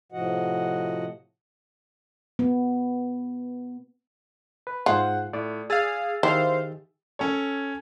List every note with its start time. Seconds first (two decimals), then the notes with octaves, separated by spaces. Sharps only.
0.12 A2 C3 F3 F#4 D#5 F#5
2.39 B3
4.67 B4
4.86 G#2 F4 G#4 C5 F#5 F#6
5.33 A2 D5
5.70 G#4 F5 E6 A6
6.23 D#3 E4 G4 G#4 C5 F5
7.19 C#4 A4 C#5